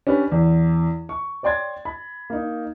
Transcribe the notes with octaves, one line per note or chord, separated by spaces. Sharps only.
C#4 D4 G4 B4
E2
C#6
C#5 D5 G5 C6 G#6 A6
B5
A#3 D#4